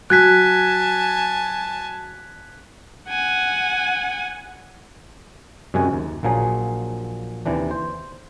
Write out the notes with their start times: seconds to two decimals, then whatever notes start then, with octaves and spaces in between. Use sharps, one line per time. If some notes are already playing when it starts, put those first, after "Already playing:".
0.10 F#3 G#5 A5 F#6 G#6 B6
3.09 F#5 G#5
5.74 F#2 C3 G#3 F#4 F#5 G#5
5.93 D#2
6.23 A#1 A#2 F3 F#3 G#4
7.46 D#2 C3 E3 D4
7.71 C5